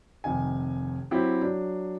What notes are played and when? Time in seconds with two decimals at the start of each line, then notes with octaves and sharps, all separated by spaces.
0.24 F1 C3 D#3 G#5
1.11 F#3 C4 E4 G4
1.42 F#3 D4